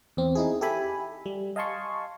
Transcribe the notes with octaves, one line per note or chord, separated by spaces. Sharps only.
E2 C4
D#4 E4 G#4
G4 A4 E5 G#5 B5
G3
D#5 F5 G#5 A5 C6 C#6